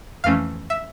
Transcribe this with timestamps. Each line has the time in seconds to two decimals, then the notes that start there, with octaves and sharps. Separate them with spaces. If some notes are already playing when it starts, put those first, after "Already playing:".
0.24 F2 E3 A3 C#4 F5
0.70 E5